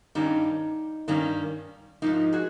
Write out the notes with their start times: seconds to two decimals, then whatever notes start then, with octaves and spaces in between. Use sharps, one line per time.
0.15 G2 D#3 G3 A#3 C#4 D#4
1.08 G2 D#3 G3 A#3 C#4
2.02 G#2 F3 A#3 D#4
2.33 F#4 G#4